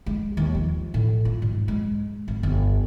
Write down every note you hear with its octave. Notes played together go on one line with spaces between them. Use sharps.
G#3
D#2
F3
A2
F4
G#2
G#3
G#1
G1